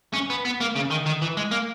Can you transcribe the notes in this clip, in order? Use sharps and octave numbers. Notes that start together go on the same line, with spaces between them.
C#4
B3
B3
A#3
C#3
D#3
D#3
E3
G#3
A#3